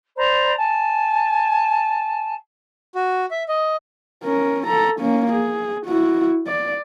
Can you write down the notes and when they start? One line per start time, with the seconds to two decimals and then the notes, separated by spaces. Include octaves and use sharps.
0.16 C5 D5 A#5 B5
0.56 G#5 A5
2.95 F#4
3.31 E5
3.49 D#5
4.24 C#4 A#4
4.67 A4 A#5
5.00 A#3 C#4
5.32 G#4
5.86 E4 F#4
6.47 D5